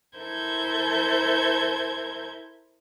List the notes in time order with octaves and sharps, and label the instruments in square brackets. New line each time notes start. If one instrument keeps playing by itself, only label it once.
[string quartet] E4 A4 A#4 C5 G6 G#6